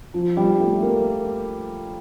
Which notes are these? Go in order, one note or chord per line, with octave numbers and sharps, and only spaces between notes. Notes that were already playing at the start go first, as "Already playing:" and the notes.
F3
G3
A3
A#3